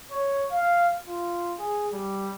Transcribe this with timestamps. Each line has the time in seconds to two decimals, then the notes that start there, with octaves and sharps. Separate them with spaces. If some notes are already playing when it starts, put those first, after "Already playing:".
0.12 C#5
0.52 F5
1.05 F4
1.59 G#4
1.93 G3